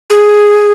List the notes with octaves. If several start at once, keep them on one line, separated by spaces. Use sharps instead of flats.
G#4